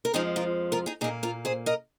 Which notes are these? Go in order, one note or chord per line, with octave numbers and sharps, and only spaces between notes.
A#4
F2 F3 G#3 D#4 G#4
F4 A#4
F4 A#4
D#4 G#4
A#2 A#3 D#4 G#4
F4 A#4
G#4 C5
A#4 D#5